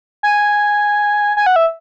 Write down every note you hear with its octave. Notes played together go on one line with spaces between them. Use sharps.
G#5
G#5
F#5
E5